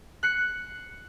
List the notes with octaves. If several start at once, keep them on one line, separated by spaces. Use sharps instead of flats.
F#6 C7 C#7